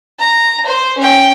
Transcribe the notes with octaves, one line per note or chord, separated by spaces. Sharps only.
A#5
C5
C#4 G5